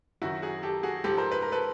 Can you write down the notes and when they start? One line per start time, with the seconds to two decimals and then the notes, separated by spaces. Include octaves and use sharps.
0.22 F#2 D#3 F#3 E4 F#4
0.42 F#4 G#4
0.63 G4 A4
0.83 F#4 G#4
1.04 G#2 F3 G4 A4
1.17 A#4 C5
1.31 B4
1.42 A#4
1.52 A4 B4